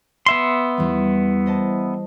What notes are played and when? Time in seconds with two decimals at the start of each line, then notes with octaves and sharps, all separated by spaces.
0.26 B3 E5 C6
0.77 E2 E3 G3
1.46 C5 D#5 A5